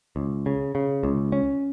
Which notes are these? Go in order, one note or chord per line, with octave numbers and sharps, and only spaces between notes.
C#2
C#3
C#3
C#2
C#4